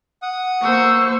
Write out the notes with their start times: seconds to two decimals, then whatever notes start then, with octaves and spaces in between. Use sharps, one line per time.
0.22 F#5 D#6
0.62 A#3 C5 C#6 E6